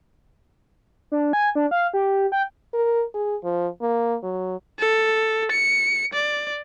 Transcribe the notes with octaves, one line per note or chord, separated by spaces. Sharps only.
D4
G#5
D4
F5
G4
G5
A#4
G#4
F3
A#3
F#3
A4
C#7
D5